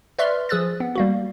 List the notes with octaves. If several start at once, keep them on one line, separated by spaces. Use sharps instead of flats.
B4 D5 E5 C6 C#6 F6
F3 G#4 D#6 E6 F#6 A6
B3
G3 A#3 F#4